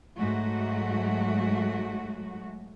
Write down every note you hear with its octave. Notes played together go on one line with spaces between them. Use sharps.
G#2 F#3 A3 F#4